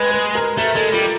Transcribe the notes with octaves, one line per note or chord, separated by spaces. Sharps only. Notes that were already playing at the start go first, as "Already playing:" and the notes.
Already playing: G#3 B4
B4
A#4
A3 A#4
G#3 A4
G3 F4